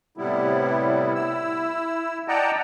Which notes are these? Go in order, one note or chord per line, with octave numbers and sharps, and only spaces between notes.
A2 C3 G3 B3 E4
E4 E6
D5 D#5 F#5 G5 A5 A#5